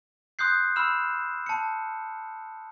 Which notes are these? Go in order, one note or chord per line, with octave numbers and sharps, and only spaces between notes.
C6 D#6 F#6 G6 C7
B5 E6 F6 E7
A5 C#7